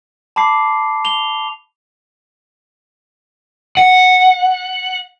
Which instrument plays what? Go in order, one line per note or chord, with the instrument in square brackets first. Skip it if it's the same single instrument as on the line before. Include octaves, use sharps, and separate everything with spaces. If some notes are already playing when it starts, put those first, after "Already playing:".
[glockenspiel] A5 B5 D6 C7
F7 G7
[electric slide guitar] F#5